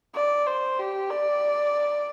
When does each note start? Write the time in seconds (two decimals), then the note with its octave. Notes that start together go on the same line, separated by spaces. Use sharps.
0.15 D5
0.46 C5
0.79 G4
1.10 D5